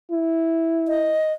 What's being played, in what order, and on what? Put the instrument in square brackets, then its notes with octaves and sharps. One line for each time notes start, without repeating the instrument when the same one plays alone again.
[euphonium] E4
[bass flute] D#5